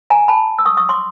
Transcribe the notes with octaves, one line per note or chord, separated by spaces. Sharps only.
G#5 A#5
A5 B5
E6
C#6 D#6
C#6 D#6
C6 D6